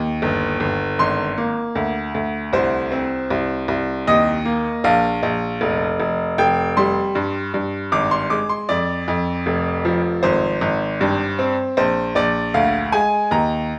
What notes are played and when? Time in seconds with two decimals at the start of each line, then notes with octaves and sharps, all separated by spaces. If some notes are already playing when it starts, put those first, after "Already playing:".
Already playing: D#2
0.22 G1
0.60 G1
0.99 G#1 C6
1.38 A#3
1.75 D2
2.14 D2
2.53 C2 C5
2.92 C4
3.30 C2
3.68 C2
4.07 D#2 D#5
4.45 A#3
4.84 A#1 F5
5.23 A#1
5.61 F1
6.00 F1
6.38 F1 G5
6.77 G3 C6
7.15 G2
7.54 G2
7.92 G#1 D6
8.11 C6
8.30 G#3 D6
8.49 C6
8.69 F2 D5
9.08 F2
9.46 F1
9.85 F3
10.23 G#1 C5
10.61 G#1
11.01 G2
11.39 C4
11.77 A#1 C5
12.15 A#1 D5
12.54 D2 F5
12.92 G#3 G#5
13.31 D#2 A#5